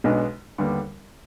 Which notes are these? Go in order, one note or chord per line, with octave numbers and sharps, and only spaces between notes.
B1 B2 G#3 B3 D4
D#2 D3 G3 B3 D4